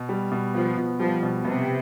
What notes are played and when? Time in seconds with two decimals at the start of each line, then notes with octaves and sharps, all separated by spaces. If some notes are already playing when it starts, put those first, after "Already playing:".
Already playing: B2
0.09 G3
0.32 B2
0.54 F3 B3
0.77 B2
0.99 F3 G3
1.23 B2
1.45 C3 B3